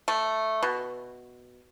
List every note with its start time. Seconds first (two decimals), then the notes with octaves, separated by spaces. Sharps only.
0.08 A3
0.63 B2